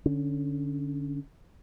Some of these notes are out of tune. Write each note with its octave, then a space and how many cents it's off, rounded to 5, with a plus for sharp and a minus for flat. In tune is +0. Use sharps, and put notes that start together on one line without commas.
D3 -5 C#4 +10